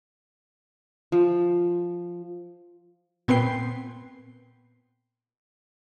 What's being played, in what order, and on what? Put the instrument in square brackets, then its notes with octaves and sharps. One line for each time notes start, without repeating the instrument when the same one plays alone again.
[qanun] F3
[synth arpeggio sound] A#2 B3 C4 B4 G5 C7